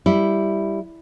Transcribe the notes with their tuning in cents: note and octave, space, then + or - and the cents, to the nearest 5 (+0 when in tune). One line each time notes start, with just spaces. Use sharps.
G3 +0 E4 +0